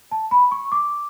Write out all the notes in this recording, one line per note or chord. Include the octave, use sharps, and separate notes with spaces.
A5
B5
C#6
D6